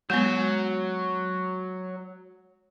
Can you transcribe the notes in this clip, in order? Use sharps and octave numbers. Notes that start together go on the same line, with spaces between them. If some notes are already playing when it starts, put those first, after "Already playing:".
F#3 G#3 B3